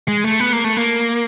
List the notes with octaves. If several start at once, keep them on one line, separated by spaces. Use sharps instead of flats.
G#3
A3
B3
A#3
A3
A#3